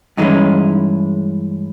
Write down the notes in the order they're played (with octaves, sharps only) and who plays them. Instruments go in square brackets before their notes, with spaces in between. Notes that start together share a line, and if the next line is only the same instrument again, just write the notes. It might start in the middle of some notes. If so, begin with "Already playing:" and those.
[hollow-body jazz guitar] G2 E3 G#3 C#4 D#4